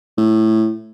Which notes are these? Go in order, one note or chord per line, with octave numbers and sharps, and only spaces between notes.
A2